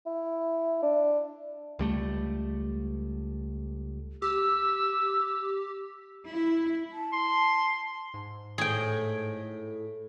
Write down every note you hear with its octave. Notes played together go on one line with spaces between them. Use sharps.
E4
D4
C#2 G3 A3
G4 E6
E4
A5
C6
G#2
A2 G#4 G5